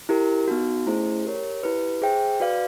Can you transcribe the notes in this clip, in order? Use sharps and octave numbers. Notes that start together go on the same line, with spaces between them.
E4 G4 A#4
B3 D#4 F#4
A3 C#4 E4 G#4 C5
G4 A#4 C#5
E4 G4 B4
G#4 C5 E5 G5
F#4 B4 D5 F5